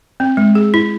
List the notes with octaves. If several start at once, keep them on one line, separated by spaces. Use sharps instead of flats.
C4
G#3
G#4
E4